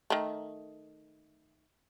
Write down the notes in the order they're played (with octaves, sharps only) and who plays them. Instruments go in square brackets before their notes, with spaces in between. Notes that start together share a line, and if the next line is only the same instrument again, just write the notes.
[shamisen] D#3 A3